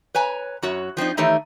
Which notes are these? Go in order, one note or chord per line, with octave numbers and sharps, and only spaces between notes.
B4 C#5 G#5 A#5
F#2 F#4 C#5
F3 C4 D4 D#4
D#3 E3 A3 D#4 G4 C#5